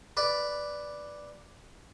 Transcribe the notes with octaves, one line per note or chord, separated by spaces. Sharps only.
B4 D5